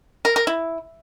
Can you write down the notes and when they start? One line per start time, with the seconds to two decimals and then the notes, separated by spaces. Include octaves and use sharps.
0.25 A#4
0.36 A#4
0.47 E4